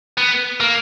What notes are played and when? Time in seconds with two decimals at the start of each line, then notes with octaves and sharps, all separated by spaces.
0.18 B3
0.60 A#3